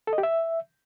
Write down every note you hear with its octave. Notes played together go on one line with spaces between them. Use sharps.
A4
D#5
G4
E5